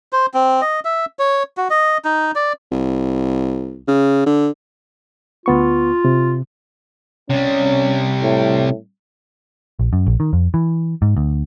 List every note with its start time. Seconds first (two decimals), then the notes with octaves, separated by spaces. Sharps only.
0.13 C5
0.34 C4
0.62 D#5
0.85 E5
1.19 C#5
1.57 F#4
1.70 D#5
2.05 D#4
2.35 D5
2.71 C2
3.88 C#3
4.26 D3
5.46 D2 B3 F4 C#6
6.05 C3
7.30 C3 G3 C#4
8.22 A2
9.79 A#1
9.93 F#2
10.07 A#1
10.20 D#3
10.33 F2
10.54 E3
11.02 G#2
11.17 D2